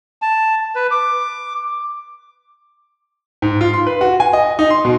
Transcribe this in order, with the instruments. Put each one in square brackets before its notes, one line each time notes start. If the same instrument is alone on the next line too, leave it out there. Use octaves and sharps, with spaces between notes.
[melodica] A5
B4
D6
[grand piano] G#2
F4
C6
B4
F#4
G#5
D#5
D#4
C6
B2